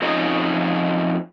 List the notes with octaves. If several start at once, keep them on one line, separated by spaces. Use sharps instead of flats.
F2 F3 C#4 D#4 C#5 D#5